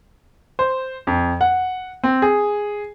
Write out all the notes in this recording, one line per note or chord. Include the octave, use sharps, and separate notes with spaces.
C5
F2
F#5
C4
G#4